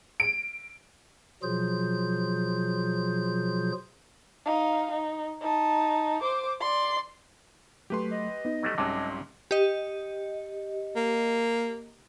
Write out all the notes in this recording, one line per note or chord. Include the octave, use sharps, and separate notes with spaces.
D7
B2 F3 F#3 F4 G#4 G6
D#4 F5
D#4
D#4 A5
C5 D6
D5 C6
F#3 A3 G4 B4 C6
D#5
B3 D#4
F#3 G3 A3
C2 G#2 C3 F#3 C#4 A5 D6
G4 D#5
A#3